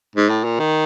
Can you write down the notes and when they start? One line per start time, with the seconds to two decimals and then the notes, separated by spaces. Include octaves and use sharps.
0.16 G#2
0.30 A2
0.44 A#2
0.60 D#3